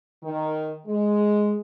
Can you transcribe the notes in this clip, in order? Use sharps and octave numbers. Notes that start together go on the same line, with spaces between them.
D#3
G#3